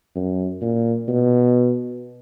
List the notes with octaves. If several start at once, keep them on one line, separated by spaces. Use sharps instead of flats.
F#2
A#2
B2